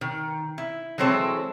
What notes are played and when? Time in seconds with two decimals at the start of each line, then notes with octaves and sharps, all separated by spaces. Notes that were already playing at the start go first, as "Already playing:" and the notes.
0.01 D#3
0.58 E4
0.98 E3 F#3 G#3 C4 A4